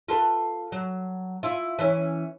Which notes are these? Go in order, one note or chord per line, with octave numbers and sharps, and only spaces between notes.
F4 A4 B4
F#3
E4 F4
E3 C#4